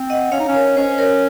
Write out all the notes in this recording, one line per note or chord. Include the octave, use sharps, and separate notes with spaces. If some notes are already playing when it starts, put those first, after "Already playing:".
Already playing: C4
D#5 F#5
C#4 C#5 F5
D#4
C#4
A#4 C#5
C#4 C5 D#5
A#4 C#5